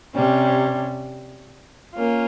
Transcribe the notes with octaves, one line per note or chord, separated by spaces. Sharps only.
C3 G3 C#4
A#3 C#4 F4